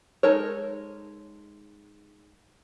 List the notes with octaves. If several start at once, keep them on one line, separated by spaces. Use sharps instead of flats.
G#3 D#4 A4 A#4 C#5